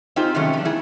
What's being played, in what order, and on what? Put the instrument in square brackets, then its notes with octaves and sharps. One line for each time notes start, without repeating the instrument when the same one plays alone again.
[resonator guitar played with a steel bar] C4 D#4 F4 G4 G#4 C5
C3 D#3 F#3 G#3 A3 C#4
F3 D4
B3 E4 G#4